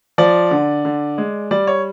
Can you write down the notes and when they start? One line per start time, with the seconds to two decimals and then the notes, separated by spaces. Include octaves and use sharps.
0.18 F3 D5
0.51 D3
0.85 D3
1.18 G#3
1.51 G3 D5
1.67 C#5